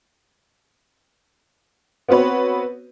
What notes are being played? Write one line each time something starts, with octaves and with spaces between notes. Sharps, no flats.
B3 C4 F#4 B4 C#5